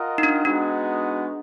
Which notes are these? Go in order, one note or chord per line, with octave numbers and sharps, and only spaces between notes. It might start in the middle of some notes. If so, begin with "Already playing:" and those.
Already playing: F4 A#4 D#5 F#5
D#4
D4
G#3 B3 D4 D#4 F#4